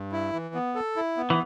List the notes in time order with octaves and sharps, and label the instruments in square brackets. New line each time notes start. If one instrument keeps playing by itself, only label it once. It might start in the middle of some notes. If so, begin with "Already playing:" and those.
Already playing: [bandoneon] G2
E4
E3
B3
A4
E4
B3
[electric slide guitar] E3